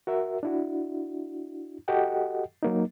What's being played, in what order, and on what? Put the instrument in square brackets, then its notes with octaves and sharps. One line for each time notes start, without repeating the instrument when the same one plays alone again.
[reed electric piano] F#4 A#4 E5
D4 E4 F#4
F#4 G4 A4 D#5 F#5 G5
F#3 A#3 D#4